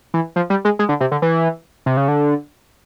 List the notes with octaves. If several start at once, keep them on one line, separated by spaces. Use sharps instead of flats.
E3
F3
G3
G#3
G#3
D3
C3
D3
E3
C3
C#3
D3